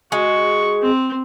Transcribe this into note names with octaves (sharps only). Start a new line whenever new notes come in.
G#3 F#4 C#6
C4